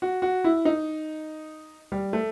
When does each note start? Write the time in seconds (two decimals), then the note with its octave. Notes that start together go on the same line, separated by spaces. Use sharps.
0.02 F#4
0.22 F#4
0.44 E4
0.65 D#4
1.92 G3
2.13 A3